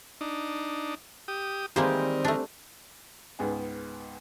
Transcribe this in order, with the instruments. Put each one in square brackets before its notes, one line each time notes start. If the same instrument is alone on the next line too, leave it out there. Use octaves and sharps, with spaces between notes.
[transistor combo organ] D4 D#4
G4 D#6
[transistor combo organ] D#3 [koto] E3 A#3 C5 [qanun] G3 G#3 G4 [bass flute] C4
[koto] A3 D4
[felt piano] C#2 G#2 B3 G#5